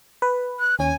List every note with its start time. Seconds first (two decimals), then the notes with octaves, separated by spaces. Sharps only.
0.22 B4
0.60 F#6
0.79 D#2 C#4 G#5